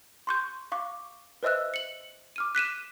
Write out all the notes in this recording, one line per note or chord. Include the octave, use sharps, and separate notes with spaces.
C6 C#6 G6
F5 C#6 D6
B4 C5 D#5 E5 E6 F#6
C#7 F#7
D6 F6 D#7
F#6 B6 D#7 E7